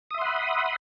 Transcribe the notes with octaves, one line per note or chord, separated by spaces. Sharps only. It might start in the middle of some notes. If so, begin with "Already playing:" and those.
E5 F#5 B5 C6 D#6